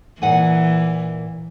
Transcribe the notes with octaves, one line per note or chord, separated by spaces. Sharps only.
A#2 E3 F#5 G#5